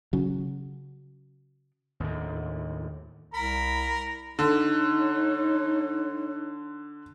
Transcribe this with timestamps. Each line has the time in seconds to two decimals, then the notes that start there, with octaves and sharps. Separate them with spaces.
0.13 C#3 F#3
2.00 D#2 A2 D3
3.34 C2 A#4 A#5 B5
4.39 D3 D#4 C#5